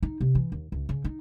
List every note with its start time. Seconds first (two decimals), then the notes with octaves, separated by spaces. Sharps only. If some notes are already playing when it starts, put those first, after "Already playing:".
0.03 D#4
0.21 C3
0.35 E3
0.52 D#2
0.72 C#2
0.89 C#3
1.04 D#4